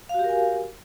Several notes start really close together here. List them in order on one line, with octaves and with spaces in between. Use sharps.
F5 F#4 G4 A#4 G#5